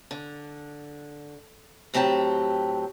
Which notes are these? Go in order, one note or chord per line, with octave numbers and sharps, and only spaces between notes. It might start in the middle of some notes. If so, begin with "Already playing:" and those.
D3
A2 F#3 C4 G4 A5 A#5